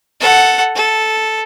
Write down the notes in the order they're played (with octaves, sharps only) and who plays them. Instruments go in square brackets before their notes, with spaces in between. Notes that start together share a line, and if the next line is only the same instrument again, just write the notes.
[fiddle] A4 F#5
A4